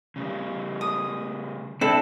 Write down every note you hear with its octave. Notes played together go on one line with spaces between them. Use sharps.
C#3 G3
D#6
C4 D4 E4 A4